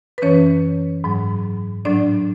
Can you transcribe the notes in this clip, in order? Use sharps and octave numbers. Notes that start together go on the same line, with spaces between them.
B4
F#2 E3 C#4 C#5
G#2 F#3
A2 F#3 D4 D5